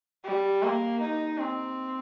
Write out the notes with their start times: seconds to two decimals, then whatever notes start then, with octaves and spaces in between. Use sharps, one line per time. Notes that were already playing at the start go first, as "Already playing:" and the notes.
0.24 G3
0.62 A#3
1.01 D#4
1.39 C4